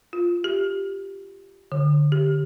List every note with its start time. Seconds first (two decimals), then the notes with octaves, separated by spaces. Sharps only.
0.13 F4
0.44 G4
1.72 D3
2.12 G4